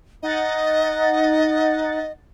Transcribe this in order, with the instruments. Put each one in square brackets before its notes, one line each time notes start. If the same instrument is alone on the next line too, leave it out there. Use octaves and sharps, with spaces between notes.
[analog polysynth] D#4 F#5 A6 [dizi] D#5